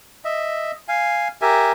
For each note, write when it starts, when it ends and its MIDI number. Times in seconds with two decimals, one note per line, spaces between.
0.25 0.72 75
0.25 0.72 76
0.88 1.28 77
0.88 1.28 80
1.42 1.72 67
1.42 1.72 70
1.42 1.72 76
1.42 1.72 80